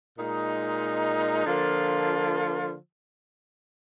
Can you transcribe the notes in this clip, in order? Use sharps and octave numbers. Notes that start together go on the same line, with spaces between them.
A#2 G#3 D#4
D3 F3 A#3 F4